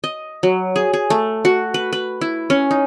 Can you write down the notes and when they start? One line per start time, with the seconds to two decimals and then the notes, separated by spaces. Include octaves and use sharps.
0.04 D#5
0.43 F#3
0.76 G#4
0.93 G#4
1.10 A3
1.45 F#4
1.74 B4
1.93 B4
2.21 E4
2.50 C#4
2.71 D#4